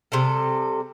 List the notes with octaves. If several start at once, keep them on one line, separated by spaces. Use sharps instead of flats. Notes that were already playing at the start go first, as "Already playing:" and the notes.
C3 G3 A4